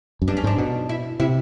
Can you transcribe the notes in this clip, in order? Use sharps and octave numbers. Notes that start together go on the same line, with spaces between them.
F#2
G2 D4
C#4
G#2 D4
B2
E4
C3 E4